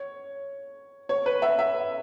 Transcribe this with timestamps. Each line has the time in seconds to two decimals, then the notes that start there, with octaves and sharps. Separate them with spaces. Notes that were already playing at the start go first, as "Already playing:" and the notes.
Already playing: C#5
1.09 C#5
1.26 B4
1.42 E5
1.59 E5